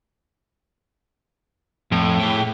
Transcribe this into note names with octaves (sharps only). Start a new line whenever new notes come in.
F2 A2
G#4 G5